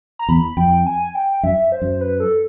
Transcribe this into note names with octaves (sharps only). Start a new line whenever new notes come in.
A#5
E2 B5
F2 G5
G#5
G5
F#2 E5
C5
F#2
B4
A4